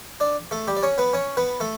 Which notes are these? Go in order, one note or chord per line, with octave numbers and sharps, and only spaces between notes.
D4 D5
A3 A4
G3 G4
D5
C#4 C#5
B3 B4
C#4 C#5
B3 B4
A3 A4